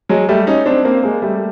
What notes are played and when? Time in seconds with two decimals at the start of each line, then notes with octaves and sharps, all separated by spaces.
0.09 F#3 G#3
0.29 G3 A3
0.47 C#4 D#4
0.66 C4 D4
0.85 A#3 C4
1.03 G#3 A#3
1.22 G3 A3